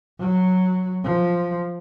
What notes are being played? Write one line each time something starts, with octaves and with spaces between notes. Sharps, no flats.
F#3
F3